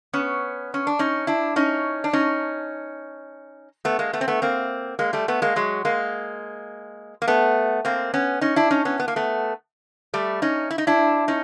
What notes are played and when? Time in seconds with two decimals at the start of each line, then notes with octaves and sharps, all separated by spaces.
0.13 B3 C#4
0.74 C#4
0.87 D4
0.99 C#4 D#4
1.27 D4 E4
1.56 C#4 D#4
2.04 D4
2.13 C#4 D#4
3.85 A3 B3
3.99 G#3 A#3
4.13 A3 B3
4.21 C4
4.28 A3 B3
4.42 A#3 C4
4.99 G#3 A#3
5.13 G3 A3
5.28 A3 B3
5.42 G#3 A#3
5.56 F#3 G#3
5.85 G#3 A#3
7.22 A#3
7.28 A3 B3
7.85 A#3 C4
8.14 B3 C#4
8.41 C#4 D#4
8.56 D4 E4
8.71 C#4 D#4
8.85 B3 C#4
9.00 B3
9.08 A#3
9.16 A3 B3
10.14 G3 A3
10.42 C#4 D#4
10.71 E4
10.78 D#4
10.87 D4 E4
11.28 C#4 D#4